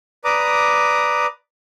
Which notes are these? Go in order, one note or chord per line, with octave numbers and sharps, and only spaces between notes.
B4 D5 A#5 D6 D#6